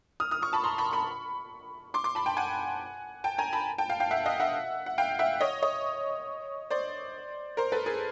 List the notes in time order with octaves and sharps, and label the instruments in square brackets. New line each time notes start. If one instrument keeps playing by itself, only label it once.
[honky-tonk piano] D#6 F6
D#6 F6
C#6 D#6
A5 B5
A#5 C6
B5 C#6
B5 C#6
C6 D6
C6 D6
A5 B5
G5 A5
F#5 G#5
G5 A5
G#5 A#5
A5 B5
G5 A5
F5 G5
F5 G5
E5 F#5
D#5 F5
E5 F#5
F#5
F5 G5
E5 F#5
C#5 D#5
C#5 D#5
C5 D5
A#4 C5
A4 B4
G#4 A#4